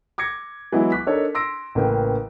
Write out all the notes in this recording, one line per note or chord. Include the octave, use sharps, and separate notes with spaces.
D6 G#6 A#6 C#7
E3 F#3 G#3 B3 E4
C#6 D6 F#6 B6
D4 D#4 A4 A#4 C#5
C6 E6 A#6 D7
A1 C#3 A#3 B4 G5